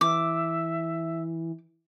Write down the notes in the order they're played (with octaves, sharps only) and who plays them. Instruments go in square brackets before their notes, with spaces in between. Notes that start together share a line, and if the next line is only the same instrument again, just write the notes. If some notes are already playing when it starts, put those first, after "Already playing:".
[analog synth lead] E3 [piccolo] E5 [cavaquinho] D6